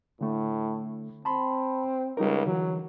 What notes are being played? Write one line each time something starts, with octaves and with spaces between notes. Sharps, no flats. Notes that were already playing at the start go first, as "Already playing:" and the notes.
A2 D3 A3
C4 A5 B5 C6
C#2 G3 D#4 A#4
D3 E3 F#3